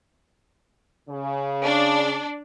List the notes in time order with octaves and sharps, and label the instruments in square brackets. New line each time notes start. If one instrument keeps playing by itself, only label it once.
[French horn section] C#3
[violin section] D4